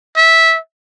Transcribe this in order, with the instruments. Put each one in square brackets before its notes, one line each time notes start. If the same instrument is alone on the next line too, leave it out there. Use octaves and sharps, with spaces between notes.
[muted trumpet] E5